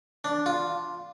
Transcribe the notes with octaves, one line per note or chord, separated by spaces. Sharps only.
D4
F4